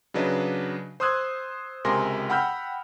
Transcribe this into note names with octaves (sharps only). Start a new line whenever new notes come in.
C#3 F#3 D4 B4 D#5
C5 C6 D#6 E6 F#6 G#6
C#2 C3 A#4 G#5 C6 A#6
F#5 G5 B5 E6 F6 G6